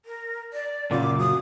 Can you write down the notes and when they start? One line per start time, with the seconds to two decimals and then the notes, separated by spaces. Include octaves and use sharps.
0.05 A#4
0.53 D5
0.91 F#2 A#2 C#3 F4 D5 D6
1.19 F#3 D#6